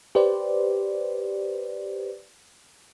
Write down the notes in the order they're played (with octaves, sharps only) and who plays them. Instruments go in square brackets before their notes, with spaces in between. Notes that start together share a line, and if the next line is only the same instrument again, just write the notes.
[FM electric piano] G4 B4 C5 D5